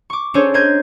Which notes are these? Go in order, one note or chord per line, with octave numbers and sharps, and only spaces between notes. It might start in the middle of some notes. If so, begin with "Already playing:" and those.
C#6 D6
C#4 D4 G#4 A4 C5 C#5
A#4 C5 D#5 G6 G#6